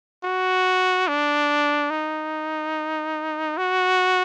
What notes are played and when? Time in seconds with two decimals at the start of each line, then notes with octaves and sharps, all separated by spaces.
0.24 F#4
1.08 D4
1.90 D#4
3.58 F#4